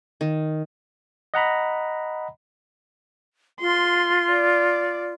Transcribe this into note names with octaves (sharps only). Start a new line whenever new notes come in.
D#3
D#5 F#5 A#5 B5
F4 C6
D5